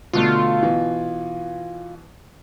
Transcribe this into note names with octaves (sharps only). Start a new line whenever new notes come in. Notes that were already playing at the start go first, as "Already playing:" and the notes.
B2 D3 A3 F4
B2 E3